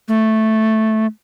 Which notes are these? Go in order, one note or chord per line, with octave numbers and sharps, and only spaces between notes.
A3